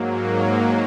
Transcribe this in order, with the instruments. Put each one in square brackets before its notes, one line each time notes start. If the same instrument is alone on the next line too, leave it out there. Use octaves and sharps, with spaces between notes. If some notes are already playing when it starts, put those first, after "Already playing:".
Already playing: [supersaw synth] G#2 F#3 A#3